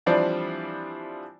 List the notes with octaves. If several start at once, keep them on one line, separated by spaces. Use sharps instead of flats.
E3 F3 G3 C4 D4 D5